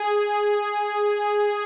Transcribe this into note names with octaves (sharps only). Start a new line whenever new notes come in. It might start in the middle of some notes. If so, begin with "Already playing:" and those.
Already playing: G#4